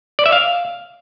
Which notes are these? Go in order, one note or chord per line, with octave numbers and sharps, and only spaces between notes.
D5
E5
F5